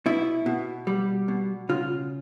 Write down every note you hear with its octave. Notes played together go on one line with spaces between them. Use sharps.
B2 E4
B2
G3
B2
C#3 F4